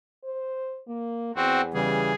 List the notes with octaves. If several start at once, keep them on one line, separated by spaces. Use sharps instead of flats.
C5
A#3
E2 C4 F#4
C#3 E3 G3 G#4